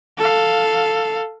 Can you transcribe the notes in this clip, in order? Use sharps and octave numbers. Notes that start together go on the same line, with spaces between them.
A4 F5